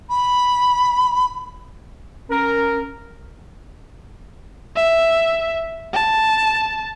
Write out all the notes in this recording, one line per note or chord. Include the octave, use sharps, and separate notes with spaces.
B5
C#4 A#4
E5
A5